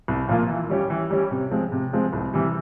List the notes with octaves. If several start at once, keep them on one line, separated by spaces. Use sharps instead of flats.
C2
A#2 F3 A#3 F4
E3
G3 C#4 G4
E3
G3 C#4 G4
C3
F3 G#3 C4
C3
F3 G#3 C4
C2
C3 E3 G3